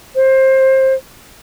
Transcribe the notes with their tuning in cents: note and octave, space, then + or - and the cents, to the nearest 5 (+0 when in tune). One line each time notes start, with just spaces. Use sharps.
C5 +20